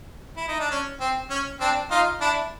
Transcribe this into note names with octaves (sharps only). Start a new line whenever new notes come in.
E4
D#4
D4
C#4
C4
C#4
C4 D4
D#4 F4
D4 E4